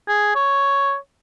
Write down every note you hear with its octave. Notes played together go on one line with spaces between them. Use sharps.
G#4
C#5